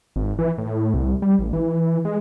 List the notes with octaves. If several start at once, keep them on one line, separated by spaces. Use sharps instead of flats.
G#1
E3
A2
C2
G3
A1
E3
G#3